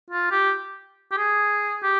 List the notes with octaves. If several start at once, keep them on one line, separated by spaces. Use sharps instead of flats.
F4
G4
G4
G#4
G4